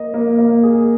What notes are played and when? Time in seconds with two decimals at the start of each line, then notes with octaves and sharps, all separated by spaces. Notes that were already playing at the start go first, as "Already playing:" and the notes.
Already playing: A#3 D#5
0.14 A#3
0.38 A#3
0.63 G#4